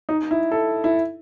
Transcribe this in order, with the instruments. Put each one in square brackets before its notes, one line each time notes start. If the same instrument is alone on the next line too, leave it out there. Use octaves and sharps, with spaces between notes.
[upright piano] D#4
E4
A4
E4